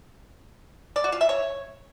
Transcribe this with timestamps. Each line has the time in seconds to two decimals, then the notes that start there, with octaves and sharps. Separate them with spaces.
0.96 D5
1.04 F#4
1.12 F4
1.21 E5
1.29 C#5